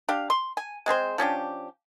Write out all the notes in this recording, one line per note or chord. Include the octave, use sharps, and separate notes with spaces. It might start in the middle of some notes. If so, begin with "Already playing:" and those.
D4 G4 F5
C6
G#5
G#3 C4 G#4 C5
F3 C#4 D4 G4